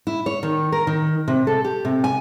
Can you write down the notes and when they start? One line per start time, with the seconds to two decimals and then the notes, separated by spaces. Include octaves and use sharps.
0.07 E4
0.26 C#5
0.43 D#3
0.72 A#4
0.87 D#3
1.28 C3
1.47 A4
1.64 G4
1.85 C3
2.04 G#5